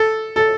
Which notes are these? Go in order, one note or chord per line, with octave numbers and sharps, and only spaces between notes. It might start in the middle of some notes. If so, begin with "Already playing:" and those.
Already playing: A4
A4